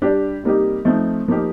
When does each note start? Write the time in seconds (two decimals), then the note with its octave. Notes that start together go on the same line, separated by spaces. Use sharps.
0.02 G3 D4 G4
0.43 C3 G3 A#3 D#4 G4
0.85 F3 A3 C4 D#4
1.28 F3 A#3 D#4 G4